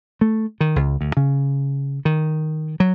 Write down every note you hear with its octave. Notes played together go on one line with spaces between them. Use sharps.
A3
D#3
C#2
D2
C#3
D#3
F#3